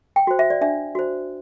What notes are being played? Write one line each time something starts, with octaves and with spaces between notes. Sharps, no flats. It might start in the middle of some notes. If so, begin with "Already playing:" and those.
G5
F#4 C5
E5
D5
D4 E5
F#4 C5